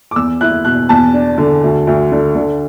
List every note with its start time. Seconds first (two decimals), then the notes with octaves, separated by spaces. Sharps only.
0.11 D6
0.16 E2 E6
0.41 E4 F#6
0.65 B2 F#6
0.89 E2 A5
1.14 D4
1.38 D3
1.63 D2
1.87 D2
2.12 D3
2.35 D3